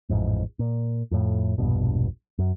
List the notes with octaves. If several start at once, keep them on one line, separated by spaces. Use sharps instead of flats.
A1 F2 G#2
A#2
F2 A2
E1 A#1 G2 B2
F#2